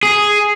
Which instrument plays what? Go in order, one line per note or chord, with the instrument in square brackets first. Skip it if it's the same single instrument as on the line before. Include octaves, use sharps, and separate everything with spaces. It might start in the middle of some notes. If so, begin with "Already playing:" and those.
[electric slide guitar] G#4